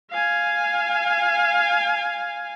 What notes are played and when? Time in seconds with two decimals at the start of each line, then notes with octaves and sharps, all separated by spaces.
0.11 F5 G#5